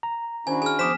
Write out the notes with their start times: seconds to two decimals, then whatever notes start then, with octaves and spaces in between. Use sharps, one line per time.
0.03 A#5
0.47 D#3 C#4 D4 E4 F#4 C5 G#5
0.62 G#4 G#5 A5 F6
0.79 F3 B3 C5 D6 D#6 B6 E7